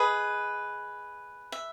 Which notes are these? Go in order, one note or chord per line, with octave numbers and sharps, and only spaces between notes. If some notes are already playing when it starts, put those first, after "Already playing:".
Already playing: G#4 B4 D#5 B5
E5